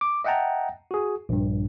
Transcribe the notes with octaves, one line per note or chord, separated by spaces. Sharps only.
D6
D#5 E5 F#5 G5 A5 A#5
F#4 G#4
A#1 G2